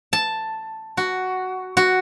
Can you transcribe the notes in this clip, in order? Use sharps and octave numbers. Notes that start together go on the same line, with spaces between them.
A5
F#4
F#4